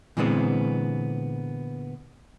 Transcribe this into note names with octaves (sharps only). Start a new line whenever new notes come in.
A#2 D3 E3 G#3 B3 C4